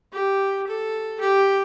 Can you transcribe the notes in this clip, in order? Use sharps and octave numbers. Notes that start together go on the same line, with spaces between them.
G4
A4
G4